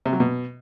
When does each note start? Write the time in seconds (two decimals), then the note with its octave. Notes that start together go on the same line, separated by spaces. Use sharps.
0.06 C3
0.13 F#3
0.20 B2